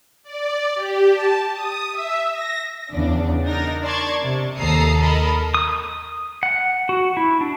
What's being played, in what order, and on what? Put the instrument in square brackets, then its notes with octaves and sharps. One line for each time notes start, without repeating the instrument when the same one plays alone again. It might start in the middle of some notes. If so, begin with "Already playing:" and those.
[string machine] D5
G4
A5
D#6
E5
A#6
[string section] E2 C#3 D4
D4 D#4 A#4 A#6
D5 A5 C6 C#6 G#6
C3
D#2 A4 A#5 D#6 C7
A4 A#4 D#5 B5
[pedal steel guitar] D#6
F#5
F#4
E4
D4